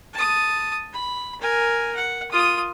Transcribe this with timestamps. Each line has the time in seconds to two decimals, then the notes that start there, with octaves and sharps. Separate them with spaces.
0.14 A5 D#6
0.93 B5
1.41 A#4 G#5
1.95 F#5
2.31 F4 D#6